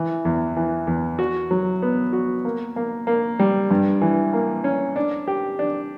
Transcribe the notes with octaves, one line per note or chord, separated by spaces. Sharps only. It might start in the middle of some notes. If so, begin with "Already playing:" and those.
Already playing: E3
E2
E3
E2
F#4
F#3
B3
F#4
A#3
A#3
A#3
G3
G2
E3
A#3
C#4
D4
G4
D4